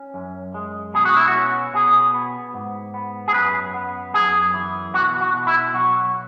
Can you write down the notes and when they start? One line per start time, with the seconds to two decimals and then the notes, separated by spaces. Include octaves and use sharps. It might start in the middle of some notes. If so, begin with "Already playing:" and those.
Already playing: C#4
0.14 F#2
0.54 G#3
0.94 B2 G#4
1.05 F#4
1.17 E4
1.28 F#4
1.34 C#4
1.74 B2 G#4
2.14 B3
2.54 G#2
2.94 B3
3.28 G#4
3.34 F#2 B4
3.74 B3
4.14 F#2 G#4
4.54 E3
4.94 B2 F#4
5.21 F#4
5.34 B2
5.47 E4
5.73 B1 F#4